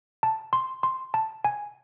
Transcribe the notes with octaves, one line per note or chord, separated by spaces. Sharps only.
A5
C6
C6
A5
G#5